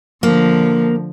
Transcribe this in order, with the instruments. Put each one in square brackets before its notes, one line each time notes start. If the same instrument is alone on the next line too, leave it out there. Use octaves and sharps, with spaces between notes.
[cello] D3 F3 [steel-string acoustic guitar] A#3